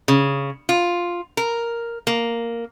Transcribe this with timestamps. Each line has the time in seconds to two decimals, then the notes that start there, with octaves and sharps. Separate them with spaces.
0.08 C#3
0.69 F4
1.37 A#4
2.07 A#3